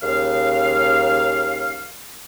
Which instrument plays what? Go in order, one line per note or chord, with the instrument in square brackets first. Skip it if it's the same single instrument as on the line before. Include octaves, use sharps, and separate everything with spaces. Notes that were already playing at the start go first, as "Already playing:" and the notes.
[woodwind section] D#2 C#3 F5